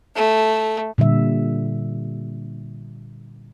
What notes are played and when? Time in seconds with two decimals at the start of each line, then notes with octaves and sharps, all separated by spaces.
0.16 A3
0.98 A#2 D3 G3 E5